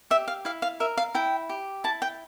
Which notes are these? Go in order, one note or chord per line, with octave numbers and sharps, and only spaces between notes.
G4 E5
F5
E4 F5
F5
A#4 E5
F5
E4 G5
G4
E4 A5
G5